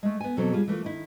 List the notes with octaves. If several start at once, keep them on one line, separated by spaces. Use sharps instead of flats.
G#3 A3
B3 G#5
E2 B2 F#3 C4 A4 A5
G3 G#3 F4 G#4
E3 A3 A#3 F4
D#3 E4